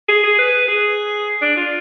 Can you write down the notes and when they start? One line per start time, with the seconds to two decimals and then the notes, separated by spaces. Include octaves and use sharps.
0.09 G#4
0.24 G#4
0.38 B4
0.68 G#4
1.41 D4
1.57 F4